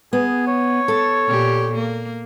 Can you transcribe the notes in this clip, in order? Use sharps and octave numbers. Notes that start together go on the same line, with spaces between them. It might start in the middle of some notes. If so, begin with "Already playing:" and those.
B3 G#4
C#5
A4
A#2 G4
A#3